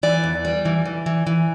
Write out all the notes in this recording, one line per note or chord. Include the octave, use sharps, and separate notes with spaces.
E3 D5
E2
G3
E3
E3
E3
E3